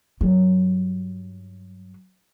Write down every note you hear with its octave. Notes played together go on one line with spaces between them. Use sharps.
G2 F#3